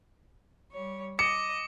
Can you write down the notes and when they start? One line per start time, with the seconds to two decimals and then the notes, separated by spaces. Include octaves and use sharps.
0.71 G3 C#5
1.19 D#5 D6 C#7